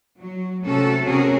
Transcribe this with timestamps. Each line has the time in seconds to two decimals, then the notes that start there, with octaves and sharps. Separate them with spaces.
0.19 F#3
0.64 C3 A3 C#4 F#4 A4
1.05 C4 C#4 F#4 G#4 A#4